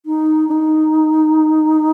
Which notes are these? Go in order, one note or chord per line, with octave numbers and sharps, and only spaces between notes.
D#4
D4
D#4